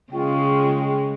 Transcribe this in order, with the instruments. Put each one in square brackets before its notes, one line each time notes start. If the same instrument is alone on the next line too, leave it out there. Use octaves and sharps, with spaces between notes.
[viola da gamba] C#3 G#3 [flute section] F4 G5 C#6